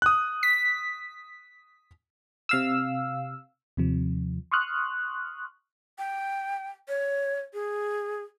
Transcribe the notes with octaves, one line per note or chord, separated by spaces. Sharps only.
D#6 F#6
B6
C3 F5 E6
D#2 C3 F3
C6 C#6 D#6 F6 F#6
G5
C#5
G#4